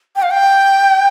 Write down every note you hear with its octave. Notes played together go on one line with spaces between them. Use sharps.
G5
F5
G5